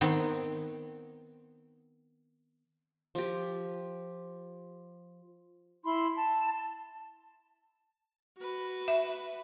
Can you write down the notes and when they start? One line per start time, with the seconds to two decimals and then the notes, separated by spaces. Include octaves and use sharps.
0.01 D#3 B3 C4 G5
3.15 F3 G4
5.84 E4 B5 C6
6.15 A5
8.39 F#4 B4
8.88 E5